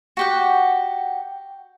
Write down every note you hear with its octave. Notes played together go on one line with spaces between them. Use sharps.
F#4 G4 F#5